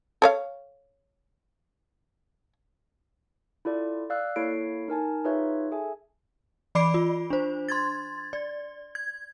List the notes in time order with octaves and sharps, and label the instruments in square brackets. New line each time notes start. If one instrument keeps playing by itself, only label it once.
[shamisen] A4 C#5 F5
[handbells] E4 F4 A4 D5
D5 F5 E6 F#6
A#3 E4 A4 C#5 C7 D7
D#4 A#4 G#5 A5
D#4 F4 G#4 B4 C#5 E5
G#4 A4 E5 G#5
[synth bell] E3 D5 B5 D6 C7 D7
F4
D4 C5
C6 G#6 A6
D5
G#6